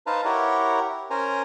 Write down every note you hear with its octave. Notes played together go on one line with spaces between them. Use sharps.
D#4 B4 C5 F5 A5 A#5
E4 G4 A#4 C#5 F#5
C#4 A#4 C5 G#5 A#5